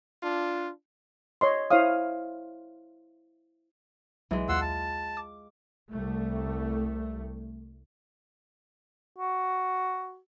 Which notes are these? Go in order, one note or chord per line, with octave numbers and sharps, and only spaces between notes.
D4 F4
C#5 D#5 C6
E4 C5 C#5 F5 D#6
B1 E3 F#3 G#3
D#2 F4 F#5 C6 E6
A5
D6
C2 A3
F#4